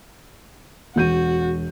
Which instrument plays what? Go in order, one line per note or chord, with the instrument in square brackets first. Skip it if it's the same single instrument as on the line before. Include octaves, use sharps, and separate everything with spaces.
[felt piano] E1 G6 D#7 [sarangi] F#4